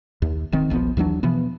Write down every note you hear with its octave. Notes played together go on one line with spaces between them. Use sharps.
D#2
D1 D#3 C4
D#1 A#1 F3 B3
D#2 E3 F#3 D4
B2 E3 F3 B3